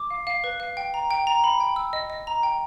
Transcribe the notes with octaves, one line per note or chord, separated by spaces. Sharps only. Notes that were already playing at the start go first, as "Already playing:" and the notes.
Already playing: D6
F5
F5
B4
F5
G5
A#5
G5
A#5
B5
G5
E6
D#5
D#5
A#5
G5